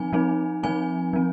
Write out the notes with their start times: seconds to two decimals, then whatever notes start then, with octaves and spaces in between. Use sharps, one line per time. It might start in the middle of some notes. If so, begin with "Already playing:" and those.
Already playing: F3 C4 D#4 G#5
0.13 F3 C4 D#4
0.63 F3 C4 D#4 G#5
1.13 F3 C4